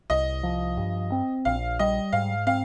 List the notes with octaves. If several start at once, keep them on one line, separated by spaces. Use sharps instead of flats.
C2 D#5
F3
G2
C4
A#1 F5
G3 D#5
G#2 F5
C4 F5